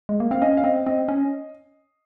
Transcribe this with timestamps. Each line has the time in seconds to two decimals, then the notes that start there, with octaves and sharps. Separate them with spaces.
0.09 G#3
0.20 A#3
0.31 C4 F5
0.42 C#4 D#5
0.57 F5
0.64 C4 D#5
0.86 C4 D#5
1.08 C#4